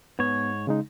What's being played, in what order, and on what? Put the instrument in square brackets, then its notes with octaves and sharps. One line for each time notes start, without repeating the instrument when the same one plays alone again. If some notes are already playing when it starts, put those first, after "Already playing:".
[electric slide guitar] G#2 C#5 [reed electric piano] B3
[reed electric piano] C#3 G#3 D#4